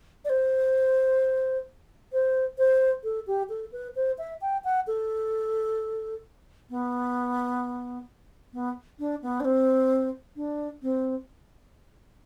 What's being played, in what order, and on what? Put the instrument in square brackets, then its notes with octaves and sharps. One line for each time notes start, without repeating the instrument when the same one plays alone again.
[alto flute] D5
C5
C5
C5
A4
G4
A4
B4
C5
E5
G5
F#5
A4
B3
B3
D4
B3
D4
C4
D4
C4